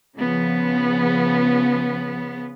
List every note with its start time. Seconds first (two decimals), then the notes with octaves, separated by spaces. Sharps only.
0.16 C#3 F3 B3